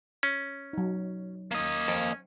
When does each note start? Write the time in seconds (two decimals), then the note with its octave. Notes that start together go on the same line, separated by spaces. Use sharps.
0.23 C#4
0.73 F#3 D#4
1.51 A#3 C#4 D#5
1.88 F2